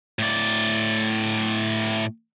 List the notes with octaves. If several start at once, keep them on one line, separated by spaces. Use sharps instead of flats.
A2 D5